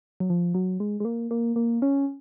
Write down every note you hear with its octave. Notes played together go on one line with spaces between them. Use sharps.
F#3
F3
F#3
G#3
G#3
A#3
A#3
A#3
C#4